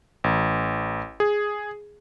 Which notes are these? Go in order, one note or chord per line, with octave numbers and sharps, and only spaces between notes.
A1
G#4